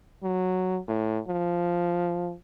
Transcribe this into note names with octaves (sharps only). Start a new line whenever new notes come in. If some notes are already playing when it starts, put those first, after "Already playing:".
F#3
A2
F3